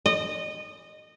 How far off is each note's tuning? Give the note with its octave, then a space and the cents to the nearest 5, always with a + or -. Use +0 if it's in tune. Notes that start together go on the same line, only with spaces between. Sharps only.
D#5 -20